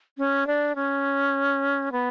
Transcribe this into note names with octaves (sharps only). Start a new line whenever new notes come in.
C#4
D4
C#4
B3